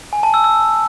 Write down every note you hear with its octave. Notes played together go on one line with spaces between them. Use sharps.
G#5
A5
E6
E6